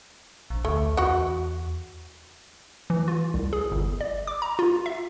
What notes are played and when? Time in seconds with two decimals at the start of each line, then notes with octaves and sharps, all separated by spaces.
0.50 A#1
0.65 D2 A3
0.97 E2 F#4 F#5
2.90 E3
3.08 F4
3.34 C2
3.53 G#4
3.72 G1
4.01 D5
4.27 D6
4.42 A#5
4.59 F4
4.86 E5